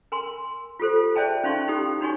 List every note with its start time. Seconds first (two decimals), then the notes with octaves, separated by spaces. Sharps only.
0.12 A#4 G#5 C6
0.80 F4 G4 A4 C5
1.15 G#4 C5 D5 E5 G5 A5
1.44 C#4 D#4 F5 C6 C#6
1.68 D#4 E4 G4 D#6
2.01 D4 D#4 F#4 C#5 G#5 C#6